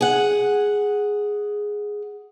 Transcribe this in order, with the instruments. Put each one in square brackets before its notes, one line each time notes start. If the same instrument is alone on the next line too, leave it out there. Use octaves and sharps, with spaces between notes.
[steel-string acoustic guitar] G#4 F#5